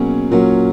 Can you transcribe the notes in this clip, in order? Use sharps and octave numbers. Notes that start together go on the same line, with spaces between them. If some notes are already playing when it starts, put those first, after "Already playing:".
Already playing: B2 F#3 A#3 C#4 G#4
A#2 F#3 A#3 C#4